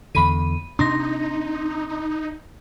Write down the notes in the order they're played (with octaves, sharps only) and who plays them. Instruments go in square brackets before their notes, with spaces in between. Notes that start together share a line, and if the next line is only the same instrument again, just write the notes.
[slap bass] E2 D3 [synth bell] B5 D#7
[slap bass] C3 D4 [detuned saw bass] D#4 [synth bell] C6 A#6